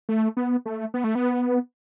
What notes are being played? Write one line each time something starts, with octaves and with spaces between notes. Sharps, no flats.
A3
B3
A3
B3
A3
B3